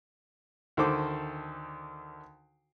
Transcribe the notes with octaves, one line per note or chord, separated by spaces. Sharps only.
D2 D#3 A4 C5 D6